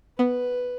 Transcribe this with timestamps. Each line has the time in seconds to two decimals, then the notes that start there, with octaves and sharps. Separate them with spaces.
0.19 B3 B4